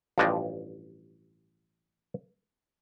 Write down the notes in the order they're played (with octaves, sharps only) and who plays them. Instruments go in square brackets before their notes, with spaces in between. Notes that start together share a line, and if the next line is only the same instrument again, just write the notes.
[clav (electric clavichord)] A1 G2 F3 D4 D#5